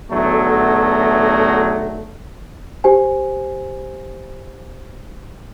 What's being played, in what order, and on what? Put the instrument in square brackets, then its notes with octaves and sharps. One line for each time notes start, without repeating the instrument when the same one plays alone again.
[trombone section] B1 E2 A2 D3 F#3 A3
[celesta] G4 C5 G#5